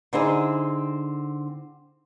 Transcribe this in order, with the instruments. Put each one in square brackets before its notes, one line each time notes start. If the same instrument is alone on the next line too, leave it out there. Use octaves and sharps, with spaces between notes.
[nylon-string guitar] D3 C4 D#4 E4 G#4